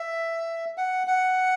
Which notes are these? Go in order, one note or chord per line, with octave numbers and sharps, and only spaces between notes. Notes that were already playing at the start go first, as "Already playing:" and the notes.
Already playing: E5
F#5
F#5